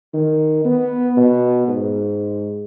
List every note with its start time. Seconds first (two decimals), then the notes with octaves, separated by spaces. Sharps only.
0.14 D#3
0.65 B3
1.17 B2
1.68 G#2